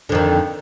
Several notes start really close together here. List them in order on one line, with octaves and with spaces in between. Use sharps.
D3 F2 D#3